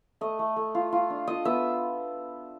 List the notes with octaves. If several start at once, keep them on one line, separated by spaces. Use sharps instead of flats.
A3 D#5
A3
A3
F4
F4
D4
F4 D#5
B3 E5